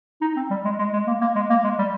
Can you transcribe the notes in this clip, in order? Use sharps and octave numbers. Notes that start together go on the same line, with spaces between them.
D#4
C4
G3
G#3
G#3
G#3
A#3
A#3
G#3
A#3
G#3
G3